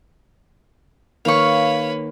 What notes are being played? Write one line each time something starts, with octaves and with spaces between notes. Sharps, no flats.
D#3 A#3 B4 C#5 F5 C#6